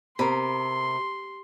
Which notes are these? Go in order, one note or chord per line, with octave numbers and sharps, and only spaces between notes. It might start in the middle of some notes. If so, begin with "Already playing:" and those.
C3 A#4 B5 C6